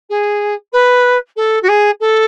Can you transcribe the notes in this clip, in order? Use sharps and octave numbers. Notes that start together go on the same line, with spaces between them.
G#4
B4
A4
F#4
G#4
A4